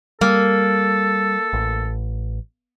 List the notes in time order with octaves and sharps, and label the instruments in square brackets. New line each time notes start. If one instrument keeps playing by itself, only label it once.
[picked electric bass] G3 [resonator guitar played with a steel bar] A#3 [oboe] A4
[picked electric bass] A1